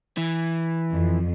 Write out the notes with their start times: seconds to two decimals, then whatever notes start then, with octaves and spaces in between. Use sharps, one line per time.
0.17 E3
0.92 F2